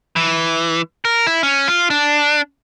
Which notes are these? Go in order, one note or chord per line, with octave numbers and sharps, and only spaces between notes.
E3
A#4
E4
C#4
F4
D4